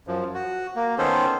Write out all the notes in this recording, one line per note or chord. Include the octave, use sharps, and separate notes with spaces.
F#2 F3
F#4
A#3
D#3 B3 C#4 A4 C5